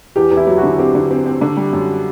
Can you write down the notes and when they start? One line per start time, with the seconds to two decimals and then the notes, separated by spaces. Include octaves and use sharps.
0.16 E2 G4
0.31 E2
0.37 E4
0.47 F#3
0.58 F#4
0.63 D3
0.79 C4 G4
0.95 D3
1.11 C4
1.26 C4
1.41 D3
1.57 G3
1.73 F#2